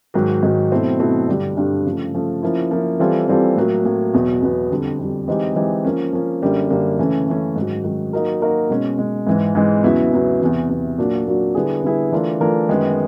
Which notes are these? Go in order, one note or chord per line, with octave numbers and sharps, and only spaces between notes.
G#2 D#3 F#3
G#2 D#3 F#3
B2 F#3 A3 C4 E4
B2 F#3 A3 C4 E4
G2 D3 G3
G2 D3 G3
C#3 F3 A3
C#3 F3 A3
F3 A#3 C#4 E4
F3 A#3 C#4 E4
E3 G3 C4 F4 A4
E3 G3 C4 F4 A4
A2 F#3 A#3
A2 F#3 A#3
E2 B2 F#3 B3
E2 B2 F#3 B3
F2 D3 G3
F2 D3 G3
E3 G#3 C4 D#4 G4
E3 G#3 C4 D#4 G4
F3 A#3 C#4
F3 A#3 C#4
F#2 D3 G3 A#3
F#2 D3 G3 A#3
C#3 E3 A3 C#4
C#3 E3 A3 C#4
G#2 D#3 F#3
G#2 D#3 F#3
F#3 A#3 D#4 F#4 A#4
F#3 A#3 D#4 F#4 A#4
B2 G#3 C#4
B2 G#3 C#4
G#2 E3 G#3
G#2 E3 G#3
E2 C#3 F#3 B3 E4
E2 C#3 F#3 B3 E4
E2 C3 E3
E2 C3 E3
A#2 F#3 A#3 D4 F#4
A#2 F#3 A#3 D4 F#4
D3 G3 B3 E4 G#4
D3 G3 B3 E4 G#4
E3 A3 D4 F4 A#4
E3 A3 D4 F4 A#4
F#2 D#3 G#3 B3